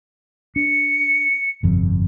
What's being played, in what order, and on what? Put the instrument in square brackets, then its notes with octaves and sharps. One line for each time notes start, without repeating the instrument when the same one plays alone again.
[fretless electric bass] D4 [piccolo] C#7
[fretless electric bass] G1 F2 C3